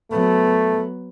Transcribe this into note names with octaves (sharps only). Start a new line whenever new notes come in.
F#3 A3 B3